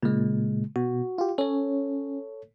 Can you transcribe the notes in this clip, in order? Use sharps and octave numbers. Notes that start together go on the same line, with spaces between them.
A#2 C#3 G#3
B2 F#4
F4 G4
C#4 A4 C#5